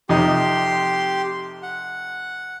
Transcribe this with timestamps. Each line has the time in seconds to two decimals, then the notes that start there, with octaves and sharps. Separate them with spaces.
0.09 F2 C3 D#4 G4 C6
1.63 F#5